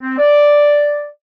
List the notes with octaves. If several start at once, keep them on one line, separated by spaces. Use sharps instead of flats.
C4
D5